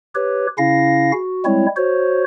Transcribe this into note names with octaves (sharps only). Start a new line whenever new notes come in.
G4 B4 C#5
C#3 C#4 E4 F5 A#6
F#4
G3 G#3 C4 E4 C#5
F#4 C5 C#5